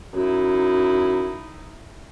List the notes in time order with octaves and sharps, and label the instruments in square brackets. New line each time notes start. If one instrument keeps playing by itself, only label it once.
[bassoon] F#2 [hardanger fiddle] D#4 E4